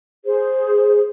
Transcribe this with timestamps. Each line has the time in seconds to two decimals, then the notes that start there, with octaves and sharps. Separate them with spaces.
0.25 G#4 C5